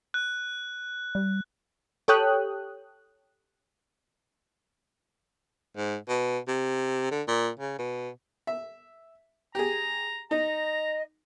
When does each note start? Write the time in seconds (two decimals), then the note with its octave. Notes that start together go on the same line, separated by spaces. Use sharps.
0.14 F#6
1.15 G3
2.08 G4 A4 C#5 G5 D#6 F#6
5.77 G#2
6.08 B2
6.48 C3
7.11 D3
7.28 A#2
7.60 C#3
7.79 B2
8.47 E5
9.55 G4 G#4 A#5
10.31 D#4 D#5 A#5